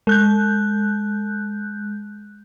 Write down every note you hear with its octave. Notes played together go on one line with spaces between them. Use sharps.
G#3 F#6 G6